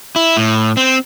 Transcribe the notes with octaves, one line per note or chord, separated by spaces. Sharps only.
E4
A2
C4